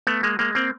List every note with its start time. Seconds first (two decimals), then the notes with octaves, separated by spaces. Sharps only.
0.07 A3 B3
0.23 G#3 A#3
0.39 G#3 A#3
0.55 A#3 C4